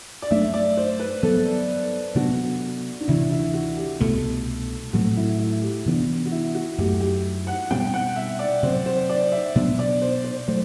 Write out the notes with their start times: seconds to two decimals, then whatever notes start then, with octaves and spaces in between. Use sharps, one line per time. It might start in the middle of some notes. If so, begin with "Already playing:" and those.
0.22 D5
0.30 G2 F#3 A3 D4 E5
0.54 D5
0.77 C5
1.00 B4
1.23 G2 F#3 B3 A4
2.15 C3 F#3 B3 D4 F#4
3.00 D4
3.08 D2 C3 E3 E4
3.31 E4
3.54 F#4
3.77 G4
4.00 C2 B2 A3 A4
4.93 A2 F#3 A3 C4 F#4
5.16 E4
5.39 E4
5.62 G4
5.86 C3 E3 B3 D4
6.26 F#4
6.31 E4
6.55 F#4
6.78 F#2 F#3 A3 G4
7.00 G4
7.47 F#5
7.71 B2 G3 C4 G5
7.94 F#5
8.16 E5
8.39 D5
8.63 C3 F#3 C4 C5
8.86 C5
9.10 D5
9.32 E5
9.55 B2 F#3 B3 D4
9.79 D5
10.02 C5
10.24 C5
10.48 F#3 A3 C5